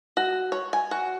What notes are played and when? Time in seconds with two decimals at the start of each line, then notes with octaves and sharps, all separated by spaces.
0.17 F#4
0.52 C#5
0.73 G#5
0.91 F#4